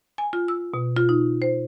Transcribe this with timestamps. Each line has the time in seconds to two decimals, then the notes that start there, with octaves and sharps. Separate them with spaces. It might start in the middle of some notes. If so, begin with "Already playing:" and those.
0.18 G#5
0.33 F4
0.48 E6
0.74 B2
0.96 F4
1.09 D#4
1.42 C5